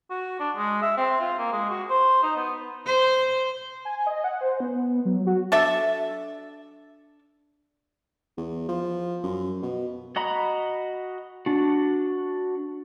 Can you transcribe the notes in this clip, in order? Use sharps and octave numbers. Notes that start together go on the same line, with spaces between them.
F#4
D4
G#3
E5
C4
F4
A#3
G#3
F#4
C5
D#4
B3
C5
G#5
D#5
F#5
C5
B3
F#3
F#4
D4 A4 E5
E2
F3
F#2
B2
F#4 D#5 A#5 B5
D4 F#4